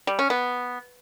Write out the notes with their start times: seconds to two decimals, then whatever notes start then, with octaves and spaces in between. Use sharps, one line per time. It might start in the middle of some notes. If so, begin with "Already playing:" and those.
0.07 G3
0.19 C#4
0.30 B3